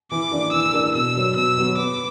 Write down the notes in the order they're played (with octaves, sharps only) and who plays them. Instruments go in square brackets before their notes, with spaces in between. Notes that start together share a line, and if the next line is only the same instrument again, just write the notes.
[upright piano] E3 [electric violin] D6
[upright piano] A#3 D4 A#4 D5
[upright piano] E3 [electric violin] E6
[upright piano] A#3 D4 A#4 D5
[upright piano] B2 [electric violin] E6
[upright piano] F#3 B3 F#4 C#5
[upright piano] B2 [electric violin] E6
[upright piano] F#3 B3 F#4 C#5
[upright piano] B3 [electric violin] D6